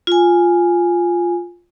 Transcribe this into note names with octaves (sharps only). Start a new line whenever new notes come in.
F4 G#5